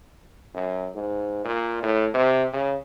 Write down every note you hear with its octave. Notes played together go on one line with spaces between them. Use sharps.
F#2
G#2
A#2
A2
C3
C#3